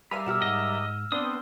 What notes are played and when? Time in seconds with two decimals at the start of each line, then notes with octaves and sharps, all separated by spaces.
0.11 G3 A#4 E5 F5 G#5 B5 F7
0.26 B2 F#4 G4 E6 F6 E7
0.42 G#2 D#5
1.12 B3 C4 D4 D#6 E6 G7